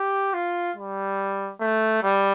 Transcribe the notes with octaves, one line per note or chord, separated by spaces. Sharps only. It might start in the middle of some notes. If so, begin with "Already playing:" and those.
Already playing: G4
F4
G3
A3
G3